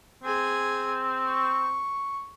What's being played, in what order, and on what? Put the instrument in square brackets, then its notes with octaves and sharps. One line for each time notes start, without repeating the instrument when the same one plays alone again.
[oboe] C4 [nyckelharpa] G#4 G#5
[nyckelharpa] C#6